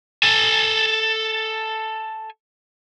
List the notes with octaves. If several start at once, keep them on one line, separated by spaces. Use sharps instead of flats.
A4 G#5